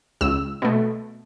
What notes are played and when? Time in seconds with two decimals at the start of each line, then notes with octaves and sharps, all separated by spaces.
0.21 C#2 E6
0.62 B2 A3